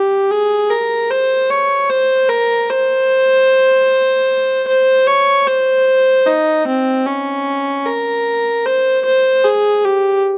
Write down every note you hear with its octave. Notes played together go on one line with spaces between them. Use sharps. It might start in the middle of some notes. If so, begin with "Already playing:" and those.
Already playing: G4
G#4
A#4
C5
C#5
C5
A#4
C5
C5
C#5
C5
D#4
C4
C#4
A#4
C5
C5
G#4
G4